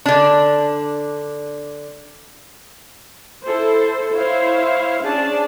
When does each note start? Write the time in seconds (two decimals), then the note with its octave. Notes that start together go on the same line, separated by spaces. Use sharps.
0.06 D3 D4
3.44 E4 A4 C5
4.12 E4 C5 C#5 E5 F5
5.04 C#4 D4 G#4 D5 A5